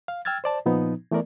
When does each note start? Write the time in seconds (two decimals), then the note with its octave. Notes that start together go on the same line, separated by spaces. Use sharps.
0.08 F5
0.25 G5 E6 F6 G#6 A6
0.44 C5 D5 A5
0.66 A#2 F3 B3 D#4
1.11 E3 A3 B3 A#4 D5